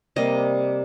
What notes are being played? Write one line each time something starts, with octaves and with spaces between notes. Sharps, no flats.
C3 G3 A#3 D#5